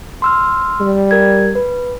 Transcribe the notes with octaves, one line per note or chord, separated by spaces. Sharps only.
C6 E6 F6
G3
A#4 G#6
B4